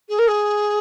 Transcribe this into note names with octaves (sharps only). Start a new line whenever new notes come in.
G#4
A#4
G#4